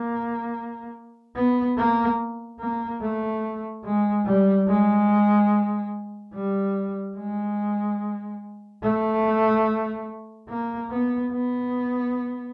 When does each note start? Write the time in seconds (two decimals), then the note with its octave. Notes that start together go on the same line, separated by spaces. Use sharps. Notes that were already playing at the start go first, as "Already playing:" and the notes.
Already playing: A#3
1.36 B3
1.77 A#3
2.60 A#3
3.02 A3
3.84 G#3
4.26 G3
4.68 G#3
6.34 G3
7.17 G#3
8.83 A3
10.49 A#3
10.91 B3
11.32 B3